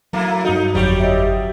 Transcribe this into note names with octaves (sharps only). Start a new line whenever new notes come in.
F#3 A3 A#3 E4
G2 D#4 F#4
G1 F2 F#3 G3 G4 C#5
D#5 E5